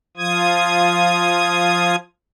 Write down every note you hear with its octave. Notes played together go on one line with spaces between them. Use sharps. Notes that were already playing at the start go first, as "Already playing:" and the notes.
F3 F4 D#6 G#6